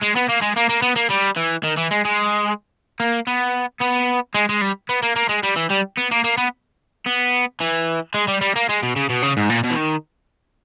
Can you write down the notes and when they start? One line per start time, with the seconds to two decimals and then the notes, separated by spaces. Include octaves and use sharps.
0.02 G#3
0.15 B3
0.29 A#3
0.42 G#3
0.56 A#3
0.69 A#3
0.82 B3
0.96 A#3
1.10 G3
1.37 E3
1.64 D#3
1.77 E3
1.91 G#3
2.05 G#3
3.00 A#3
3.27 B3
3.80 B3
4.35 G#3
4.49 G#3
4.61 G3
4.89 B3
5.03 A#3
5.16 A#3
5.29 G#3
5.43 G3
5.56 E3
5.71 G3
5.98 B3
6.12 A#3
6.24 A#3
6.38 B3
7.06 B3
7.60 E3
8.14 G#3
8.28 G3
8.41 G3
8.56 A#3
8.69 G#3
8.83 B2
8.96 C#3
9.10 B2
9.22 C#3
9.37 G#2
9.50 A#2
9.64 B2
9.71 E3
9.76 D#3